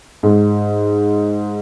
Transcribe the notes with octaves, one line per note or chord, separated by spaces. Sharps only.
G#2